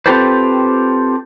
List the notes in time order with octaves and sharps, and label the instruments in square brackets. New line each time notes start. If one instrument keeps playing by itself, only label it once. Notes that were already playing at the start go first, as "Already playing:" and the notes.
[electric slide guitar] C4 F4 G4 A4 B4 C5